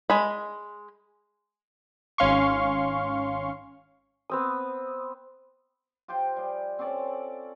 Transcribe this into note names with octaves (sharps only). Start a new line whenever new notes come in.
G#3 B5
G#1 C#4 F5 C6 C#6
B3 C4 D#6
F4 G4 C5 G5
G3 G#4
C4 C#4 A4 D5